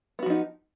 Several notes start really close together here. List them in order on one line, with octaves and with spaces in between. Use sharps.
B3 F#4 F3 D#4